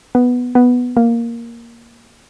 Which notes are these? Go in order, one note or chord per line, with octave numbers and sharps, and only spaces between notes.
B3
B3
A#3